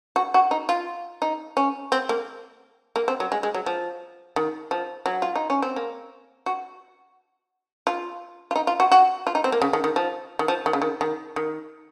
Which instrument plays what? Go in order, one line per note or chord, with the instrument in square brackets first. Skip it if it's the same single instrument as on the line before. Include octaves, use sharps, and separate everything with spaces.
[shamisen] F#4
F#4
D#4
F4
D#4
C#4
C4
A#3
A#3
C4
F#3
G#3
G#3
F#3
F3
D#3
F3
F#3
F4
D#4
C#4
C4
A#3
F#4
F4
F4
D#4
F4
F#4
F#4
F4
D#4
C4
A#3
C#3
D#3
D#3
F3
D#3
F3
D#3
C#3
D#3
D#3
D#3